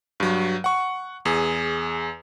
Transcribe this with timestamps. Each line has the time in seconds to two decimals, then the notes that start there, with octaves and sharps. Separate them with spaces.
0.20 G2 F#3
0.64 F#5 C#6
1.25 E2 G#4